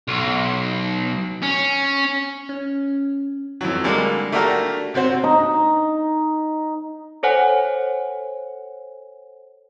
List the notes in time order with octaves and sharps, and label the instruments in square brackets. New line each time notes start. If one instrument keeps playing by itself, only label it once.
[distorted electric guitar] B1
C#4
[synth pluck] C#4
[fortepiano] F2 E3 F#3
D3 G3 G#3 A#3
A3 A#3 D4 F#4 G4 A#4
C3 C4 F#4 C5
[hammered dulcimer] D#4
[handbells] A4 C5 C#5 F#5 G#5